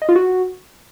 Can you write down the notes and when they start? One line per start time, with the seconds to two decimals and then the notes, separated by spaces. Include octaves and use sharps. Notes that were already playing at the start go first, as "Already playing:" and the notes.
0.02 D#5
0.09 F4
0.16 F#4